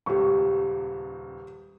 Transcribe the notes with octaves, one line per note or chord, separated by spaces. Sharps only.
D#1 C#2 G4 C#6